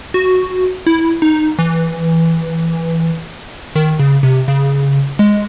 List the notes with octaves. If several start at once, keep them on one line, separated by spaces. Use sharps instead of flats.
F#4
E4
D#4
E3
D#3
C#3
C3
C#3
G#3